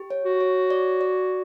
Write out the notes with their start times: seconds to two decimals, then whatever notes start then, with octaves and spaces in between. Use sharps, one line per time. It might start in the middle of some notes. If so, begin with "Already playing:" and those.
Already playing: G4
0.10 C#5
0.25 F#4
0.41 C#5
0.70 D5
1.01 D5